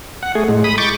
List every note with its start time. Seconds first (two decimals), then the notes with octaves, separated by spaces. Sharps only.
0.23 F#5
0.35 A3 G#4
0.49 A2 G#3
0.64 B5 D#6
0.78 C#6 D6 G6 A6